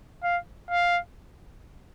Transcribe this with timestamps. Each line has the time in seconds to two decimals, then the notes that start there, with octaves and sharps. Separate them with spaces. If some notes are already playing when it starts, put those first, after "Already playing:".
0.23 F5
0.71 F5